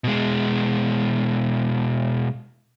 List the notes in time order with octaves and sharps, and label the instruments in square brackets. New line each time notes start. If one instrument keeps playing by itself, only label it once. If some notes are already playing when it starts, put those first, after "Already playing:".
[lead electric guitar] B2 G#3